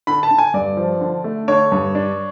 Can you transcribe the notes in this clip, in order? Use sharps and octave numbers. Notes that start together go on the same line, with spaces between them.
D3 B5
A5
D3
G#5
G2 D5
F3
D3
A3
D3 C#5
G2
D4